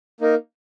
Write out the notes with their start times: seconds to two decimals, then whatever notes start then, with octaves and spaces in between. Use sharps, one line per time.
0.21 A#3 D#4 A#4